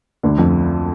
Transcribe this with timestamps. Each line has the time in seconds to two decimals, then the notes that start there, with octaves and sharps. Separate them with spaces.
0.23 D2 D3
0.38 F2 F3